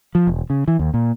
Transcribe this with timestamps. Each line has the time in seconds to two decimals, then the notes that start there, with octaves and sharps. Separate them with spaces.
0.15 F3
0.27 E1
0.50 C#3
0.68 E3
0.79 D#2
0.94 A#2